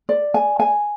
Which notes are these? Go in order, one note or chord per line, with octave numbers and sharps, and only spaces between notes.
D5
G#5
G#5